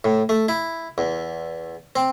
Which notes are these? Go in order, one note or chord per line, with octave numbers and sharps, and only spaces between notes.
A2
A3
E4
E2
C4